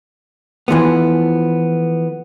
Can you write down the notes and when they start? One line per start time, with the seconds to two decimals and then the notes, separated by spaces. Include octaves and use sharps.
0.68 E3 F3 A3 B3